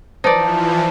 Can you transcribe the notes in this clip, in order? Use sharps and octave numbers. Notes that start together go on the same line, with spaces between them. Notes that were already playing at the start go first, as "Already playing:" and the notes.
E3 F3 D#4 B4 C5 D5 A5